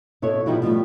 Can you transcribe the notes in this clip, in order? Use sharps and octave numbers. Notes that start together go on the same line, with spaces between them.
B2 E4 A4 C#5
B2 F3 D#4 E4 F#4 G4
B2 F3 G3 A3